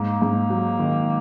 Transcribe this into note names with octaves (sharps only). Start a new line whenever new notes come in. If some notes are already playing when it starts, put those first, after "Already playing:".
Already playing: G#2 A#3
G#2
F#3
D#3